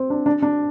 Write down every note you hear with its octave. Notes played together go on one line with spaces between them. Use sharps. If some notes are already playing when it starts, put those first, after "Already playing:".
Already playing: C4
D4
D4
D4